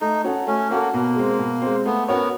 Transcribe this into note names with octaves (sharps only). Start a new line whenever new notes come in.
A3 D#4
C#4 F#4 A4
A3 C#4
A#3 C#4 F#4 A4
B2 A#3
G#3 C4
B2
G#3 C4
A3 B3
B3 C#4 F#4 A#4 C#5